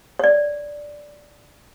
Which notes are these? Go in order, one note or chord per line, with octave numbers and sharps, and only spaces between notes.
C#5 D5